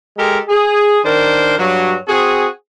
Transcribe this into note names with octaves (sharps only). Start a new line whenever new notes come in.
G#3 G4 A4 A#4
G#4
D#3 D4 A#4 C5
G2 F#3
C4 F#4 G#4